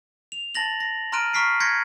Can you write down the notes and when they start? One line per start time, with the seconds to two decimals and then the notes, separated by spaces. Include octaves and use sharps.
0.32 F7
0.55 A5 A6 A#6 F#7
0.80 A#6
1.12 A#5 C6 F6 F#6 D7 D#7
1.33 A#5 C#6 F6 B6 C7 D7
1.60 C6 G6 G#6 A#6 B6 C#7